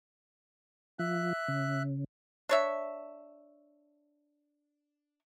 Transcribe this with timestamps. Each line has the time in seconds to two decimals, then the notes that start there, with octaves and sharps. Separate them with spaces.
0.99 F3 E5 F#6
1.48 C#3
2.49 D4 C#5 E5